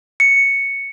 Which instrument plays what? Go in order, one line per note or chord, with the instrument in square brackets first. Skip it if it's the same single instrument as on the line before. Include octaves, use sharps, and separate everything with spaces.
[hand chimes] C#7